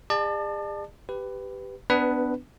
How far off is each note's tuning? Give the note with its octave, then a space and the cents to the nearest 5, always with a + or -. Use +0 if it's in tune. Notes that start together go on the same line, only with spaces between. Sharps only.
G#4 -40 D5 +40 A5 +0
G4 +0 B4 +15
B3 +25 D4 +0 B4 +0